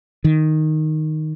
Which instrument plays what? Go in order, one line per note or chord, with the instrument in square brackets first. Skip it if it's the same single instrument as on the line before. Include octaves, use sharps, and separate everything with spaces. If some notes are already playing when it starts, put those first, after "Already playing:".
[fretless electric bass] D#3